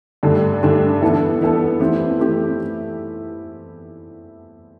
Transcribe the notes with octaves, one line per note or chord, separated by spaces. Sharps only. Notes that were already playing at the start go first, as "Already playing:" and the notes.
G2 D3 A3 D4
G2 D3 A3 D4
E3 B3 E4 A4
E3 B3 E4 A4
E3 A3 C4 E4 G4
E3 A3 C4 E4 G4